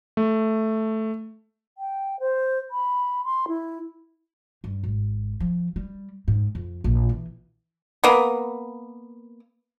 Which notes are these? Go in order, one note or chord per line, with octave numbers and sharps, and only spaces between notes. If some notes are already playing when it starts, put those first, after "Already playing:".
A3
G5
C5
B5
C6
E4
G2
G#1
F3
G3
G#2
F2
A#1
E3
A#3 B3